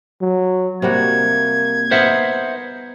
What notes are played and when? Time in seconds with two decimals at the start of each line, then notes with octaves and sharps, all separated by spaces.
0.22 F#3
0.82 C3 G3 A#3 F#4 G#6
1.91 B3 D#4 A#4 C5 E5 F#5